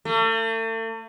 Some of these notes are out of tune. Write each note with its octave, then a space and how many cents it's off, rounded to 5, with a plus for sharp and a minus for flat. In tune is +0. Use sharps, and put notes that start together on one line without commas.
A3 +40